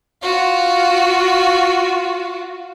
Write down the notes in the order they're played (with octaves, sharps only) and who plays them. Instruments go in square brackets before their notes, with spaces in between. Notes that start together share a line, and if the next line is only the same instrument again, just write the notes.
[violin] F4 F#4